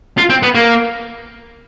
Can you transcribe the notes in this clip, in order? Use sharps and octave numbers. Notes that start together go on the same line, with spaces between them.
F4
C4
B3
A#3